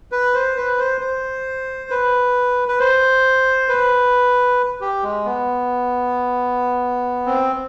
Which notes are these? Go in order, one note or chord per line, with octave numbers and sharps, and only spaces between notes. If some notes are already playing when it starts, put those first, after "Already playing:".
B4
C5
B4
C5
C5
B4
B4
C5
B4
G4
G#3
B3
C4